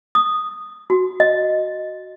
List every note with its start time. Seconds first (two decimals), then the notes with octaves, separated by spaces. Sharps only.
0.15 D#6
0.90 F#4
1.20 D#5